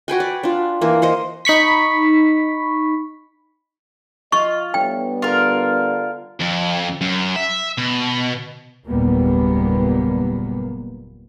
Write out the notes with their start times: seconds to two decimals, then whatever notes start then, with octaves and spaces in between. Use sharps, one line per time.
0.08 F#4 B4 G5 G#5
0.20 D5
0.43 D4 F4
0.81 E3 A#3
1.02 A#4 C5 D#5
1.45 D#4 B5 C#6 B6
4.32 F4 D#5 C#6
4.74 A2 G3 B3 D4 G5
5.22 D3 F4 A#4
6.40 F2
7.01 F#2
7.36 E5
7.78 B2
8.87 F#1 D#2 A#2 G3 A#3 B3